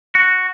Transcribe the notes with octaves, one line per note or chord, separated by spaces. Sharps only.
F#4